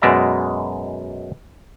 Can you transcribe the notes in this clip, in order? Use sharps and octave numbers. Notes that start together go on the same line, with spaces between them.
F#2 B2 G#3 D5 E5 A#5